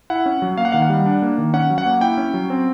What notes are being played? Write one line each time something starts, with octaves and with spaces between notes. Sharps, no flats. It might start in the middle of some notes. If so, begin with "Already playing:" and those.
E4 F#5
C#4
F#3
A#3 F5
F#5
D#3 F5
F#5
G3
D4
A#3
D#3
C#4 F#5
F#3
F#5
A#3
E4 G5
C#4
F#3
C4